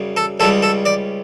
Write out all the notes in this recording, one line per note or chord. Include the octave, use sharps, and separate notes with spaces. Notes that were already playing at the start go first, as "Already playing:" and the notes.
Already playing: F#2 C#3 G3
A4
C#2 C#3 G3 A4
A4
D5